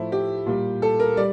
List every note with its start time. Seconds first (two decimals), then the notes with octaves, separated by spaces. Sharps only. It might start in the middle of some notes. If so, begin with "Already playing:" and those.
Already playing: A2 F3 A3 E4
0.12 G4
0.46 A#2 G3
0.82 A4
1.00 A#4
1.17 G3 D5